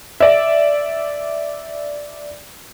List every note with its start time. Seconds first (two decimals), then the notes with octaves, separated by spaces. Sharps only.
0.20 D5 E5